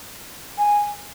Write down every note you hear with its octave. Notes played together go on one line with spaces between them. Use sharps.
G#5